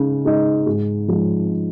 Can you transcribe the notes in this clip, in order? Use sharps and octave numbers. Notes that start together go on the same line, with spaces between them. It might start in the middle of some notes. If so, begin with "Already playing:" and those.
Already playing: C#3 G#3 D#4
G#3 D#4
G#2
F3 G#3